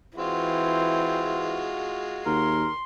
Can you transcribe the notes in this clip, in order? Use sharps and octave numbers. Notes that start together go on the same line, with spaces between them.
E3 G#3 C4 F4 F#4
D#2 A#4 C6